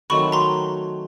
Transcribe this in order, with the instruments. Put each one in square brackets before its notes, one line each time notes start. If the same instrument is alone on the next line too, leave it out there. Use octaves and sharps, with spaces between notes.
[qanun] D#3 F#3 A3 C4 [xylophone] B5 C#6
[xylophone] A#5 C6